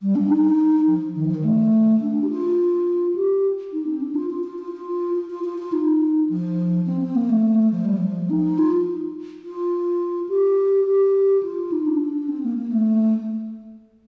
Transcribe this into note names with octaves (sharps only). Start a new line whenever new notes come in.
G3
D4
D#4
F3
D#3
F3
D#3
A3
D4
G4
F4
G4
D#4
C4
D4
F4
F4
F4
F4
F4
F4
F4
F4
F4
D#4
F3
C4
C4
A#3
A3
F3
G3
F3
D#4
F4
F4
G4
G4
F4
D#4
D4
D4
C4
A#3
A#3
A3